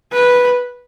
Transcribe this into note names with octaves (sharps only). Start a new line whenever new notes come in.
B4